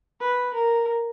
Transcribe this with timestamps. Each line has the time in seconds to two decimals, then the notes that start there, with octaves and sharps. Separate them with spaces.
0.20 B4
0.54 A#4